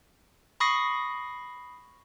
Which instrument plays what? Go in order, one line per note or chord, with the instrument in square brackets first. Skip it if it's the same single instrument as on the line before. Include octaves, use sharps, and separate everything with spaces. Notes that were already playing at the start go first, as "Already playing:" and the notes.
[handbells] B5 C#6 D#6 A#6 C7